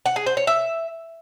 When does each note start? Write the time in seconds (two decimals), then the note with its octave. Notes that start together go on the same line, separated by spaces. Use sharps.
0.06 F#5
0.16 G#4
0.26 C5
0.37 C#5
0.47 E5